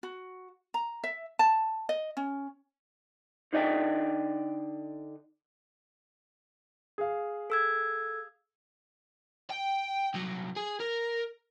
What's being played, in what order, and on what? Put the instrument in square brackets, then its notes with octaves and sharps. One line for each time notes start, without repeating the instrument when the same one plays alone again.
[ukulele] F#4
A#5
E5
A5
D#5
C#4
[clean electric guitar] D3 D#4 D5 D#5 G5
[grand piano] G#4 F5
[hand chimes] A4 E6 G#6
[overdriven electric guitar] G5
C2 F#3
G#4
A#4